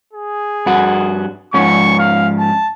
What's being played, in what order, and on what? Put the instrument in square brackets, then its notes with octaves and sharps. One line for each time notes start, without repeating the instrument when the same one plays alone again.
[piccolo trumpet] G#4
[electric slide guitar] G2 F#4
[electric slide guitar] G#2 F3 C#4 [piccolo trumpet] C#6
[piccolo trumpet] F5
A5